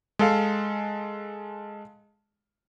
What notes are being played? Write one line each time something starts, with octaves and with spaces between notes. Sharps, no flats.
G#3 A4 F5